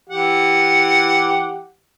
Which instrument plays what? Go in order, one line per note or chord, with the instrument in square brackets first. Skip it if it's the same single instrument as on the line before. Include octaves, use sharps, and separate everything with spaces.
[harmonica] E3 G4 F#5